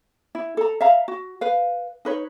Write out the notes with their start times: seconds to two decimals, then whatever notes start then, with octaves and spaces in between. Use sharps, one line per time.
0.35 E4
0.57 A4 A#5
0.80 E5 F5 A#5
1.08 F#4
1.41 B4 F5
2.05 D#4 B4 C#5